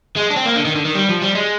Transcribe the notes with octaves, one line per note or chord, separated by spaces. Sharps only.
G#3
D4
C4
A#3
D3
D#3
D3
D#3
G3
F3
G3
G#3